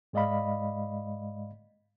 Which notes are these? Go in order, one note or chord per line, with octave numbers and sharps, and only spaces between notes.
G#2 G#3 D5 D#5 F5 B5